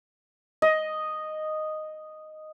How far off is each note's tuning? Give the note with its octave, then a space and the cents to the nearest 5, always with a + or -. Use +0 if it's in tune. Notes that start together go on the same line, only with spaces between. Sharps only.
D#5 -5